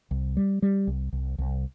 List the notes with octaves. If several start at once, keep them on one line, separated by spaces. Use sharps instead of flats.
C2
G3
G3
C2
C2
C2